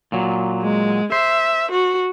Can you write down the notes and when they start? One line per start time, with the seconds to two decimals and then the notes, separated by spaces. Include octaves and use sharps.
0.12 A#2 F#3
0.62 G#3
1.12 C5 E5
1.71 F#4